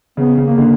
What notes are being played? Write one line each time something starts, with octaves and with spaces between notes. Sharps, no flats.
C#3 B3
C#3 A#3
D3